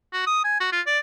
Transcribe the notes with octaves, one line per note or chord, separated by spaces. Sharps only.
F#4
D#6
G#5
F#4
F4
D5